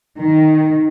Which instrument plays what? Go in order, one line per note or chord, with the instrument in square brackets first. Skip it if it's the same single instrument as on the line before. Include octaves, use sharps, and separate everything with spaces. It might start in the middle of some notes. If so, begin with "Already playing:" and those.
[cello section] D#3